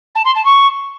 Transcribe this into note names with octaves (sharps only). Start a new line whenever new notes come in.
A5
C6
A5
C#6